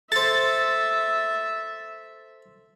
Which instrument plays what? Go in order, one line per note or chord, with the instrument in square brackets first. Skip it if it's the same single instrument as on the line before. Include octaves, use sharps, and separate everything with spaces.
[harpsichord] A4 C5 [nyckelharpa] E5 [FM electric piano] A6